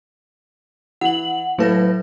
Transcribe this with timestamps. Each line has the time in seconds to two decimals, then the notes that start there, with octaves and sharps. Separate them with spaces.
1.01 E3 F#5 F#7
1.58 A2 F#3 A3 B4 A#6